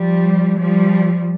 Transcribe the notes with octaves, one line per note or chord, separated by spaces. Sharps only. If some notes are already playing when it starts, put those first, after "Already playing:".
Already playing: F3 G3
F3 G3